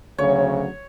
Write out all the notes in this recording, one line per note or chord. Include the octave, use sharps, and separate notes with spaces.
D2 C#3 F#3 C#5